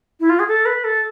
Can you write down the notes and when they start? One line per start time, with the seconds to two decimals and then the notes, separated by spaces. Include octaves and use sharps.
0.20 E4
0.29 F4
0.39 G#4
0.48 A4
0.65 B4
0.84 A4